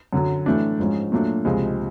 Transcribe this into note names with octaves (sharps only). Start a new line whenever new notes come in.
F#2 D3 F#3
A2 E3 A3 D4
G#2 F3 G#3 C#4
A#2 F#3 A3 D4
C#2 C3 F3 G#3